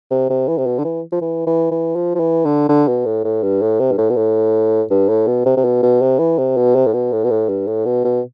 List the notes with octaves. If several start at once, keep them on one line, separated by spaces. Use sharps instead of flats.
C3
C3
E3
C3
B2
D3
E3
F3
E3
E3
E3
F3
F3
E3
D3
D3
B2
A2
A2
G2
A2
C3
G2
A2
B2
A2
G2
A2
B2
C3
C3
B2
B2
C3
E3
C3
B2
C3
A2
B2
A2
B2
A2
G2
A2
B2
B2